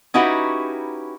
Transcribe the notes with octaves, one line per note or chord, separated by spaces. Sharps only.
C#4 D#4 E4 F#4 G4 B4